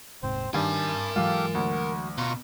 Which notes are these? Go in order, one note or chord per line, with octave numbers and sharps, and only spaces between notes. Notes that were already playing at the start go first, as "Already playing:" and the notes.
D#1 G#2 C3 C4 C5
G2 D#3 A#4 G#5 A5
E3 F#3 G#3 F4 G4 A4 F5
D2 F#4
B2 F4 A#5 C#6